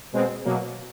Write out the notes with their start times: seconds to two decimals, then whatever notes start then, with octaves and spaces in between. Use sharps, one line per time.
0.13 B2 G#3 C4
0.45 B2 F#3 A#3